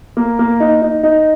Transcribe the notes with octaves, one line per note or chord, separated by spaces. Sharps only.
A#3
A#3
D#4
D#4
D#4